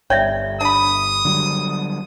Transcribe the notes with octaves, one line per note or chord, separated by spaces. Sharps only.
G1 C#5 D5 E5 G5
D4 B5 D#6
D3 F#3 G3